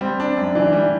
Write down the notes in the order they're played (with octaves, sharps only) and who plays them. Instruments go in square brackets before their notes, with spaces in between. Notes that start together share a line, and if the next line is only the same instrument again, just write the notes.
[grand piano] G3 [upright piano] C4 C5
[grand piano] D4
F#2
[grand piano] E3 [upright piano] D4 D5
[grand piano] G3